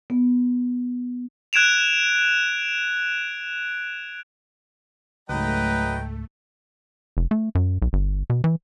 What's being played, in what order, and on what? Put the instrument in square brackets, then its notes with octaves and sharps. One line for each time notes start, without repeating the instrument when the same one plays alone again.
[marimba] B3
[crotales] F#6 G#6 D7 E7 F7
[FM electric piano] C#2 G#2 [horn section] F#3 B4 [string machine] A3 [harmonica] D#5 G5 A#5
[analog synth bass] F1
A3
F#2
B1
G1
B2
E3